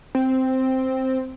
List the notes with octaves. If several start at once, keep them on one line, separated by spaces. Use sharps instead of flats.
C4